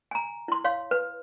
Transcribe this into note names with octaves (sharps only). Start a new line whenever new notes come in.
G#5 A#5
E4 C6
C#5 F5 C6
B4